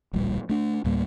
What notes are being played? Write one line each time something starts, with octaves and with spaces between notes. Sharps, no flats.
D1 A#1 A#2 G3
A3 D4
D2 A2 G3 A#3